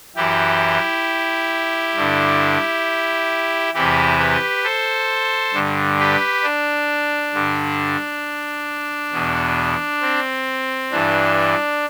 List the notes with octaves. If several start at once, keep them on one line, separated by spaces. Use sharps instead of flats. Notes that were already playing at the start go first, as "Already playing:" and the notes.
F#2 E3 E4 G4
G2 D3
E2 C3 E3 E4 G4
G4 B4
A4 C5
G2 D3
G4 B4
D4
G2 D3
E2 B2
C4
G2 E3 D4